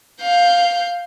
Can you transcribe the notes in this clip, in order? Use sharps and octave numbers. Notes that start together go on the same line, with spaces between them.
F5 G6